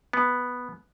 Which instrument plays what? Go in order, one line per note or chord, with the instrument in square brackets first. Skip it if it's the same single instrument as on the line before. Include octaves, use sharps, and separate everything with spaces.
[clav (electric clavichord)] B3